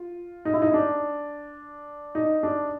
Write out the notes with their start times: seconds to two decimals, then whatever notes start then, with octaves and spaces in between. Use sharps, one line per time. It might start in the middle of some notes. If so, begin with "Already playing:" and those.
Already playing: F4
0.45 D#4
0.54 E4
0.62 D#4
0.74 D4
2.15 D#4
2.43 D4